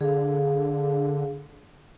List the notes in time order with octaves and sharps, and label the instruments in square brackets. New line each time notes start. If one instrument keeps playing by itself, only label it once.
[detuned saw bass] D3 [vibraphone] G#4 F5